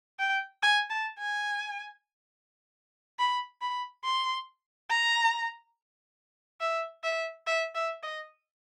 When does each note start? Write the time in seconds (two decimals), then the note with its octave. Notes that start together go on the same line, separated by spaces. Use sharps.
0.19 G5
0.63 G#5
0.90 A5
1.19 G#5
3.19 B5
3.61 B5
4.04 C6
4.90 A#5
6.61 E5
7.04 E5
7.47 E5
7.75 E5
8.03 D#5